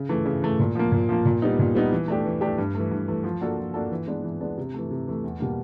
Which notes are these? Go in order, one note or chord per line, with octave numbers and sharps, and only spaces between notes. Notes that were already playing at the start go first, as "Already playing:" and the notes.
Already playing: C#3
E3 A3
C#3
E3 A3
A#2
F3 A#3
A#2
F3 A#3
A#2
G3 B3 D#4
A#2
G3 B3 D#4
E3
A3 D4 G4
E3
A3 D4 G4
G2
E3 A3
G2
E3 A3
F3
A#3 D4 F#4 A4
F3
A#3 D4 F#4 A4
E3
G#3 B3 D4
E3
G#3 B3 D4
C3
E3 A3
C3
E3 A3
E2
B2 G3 A#3